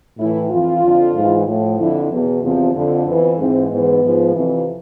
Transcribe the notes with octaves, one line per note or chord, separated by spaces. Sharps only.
A2 E3 E4
F2 E3 F4
F2 D3 F3
G#2 E3
A2 F3
F2 D3 F3 E4
E2 B2
E2 C3 F3
F2 D3 F3
F2 E3 B3
G#2 E3 C4
G#2 E3 B3
G#2 F3
F2 C3 E3